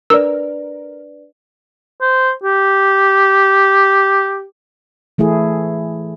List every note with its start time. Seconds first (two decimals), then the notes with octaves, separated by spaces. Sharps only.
0.10 D4 A#4 B4 D5 E6
2.01 C5
2.44 G4
5.18 E3 A3 E4 G#4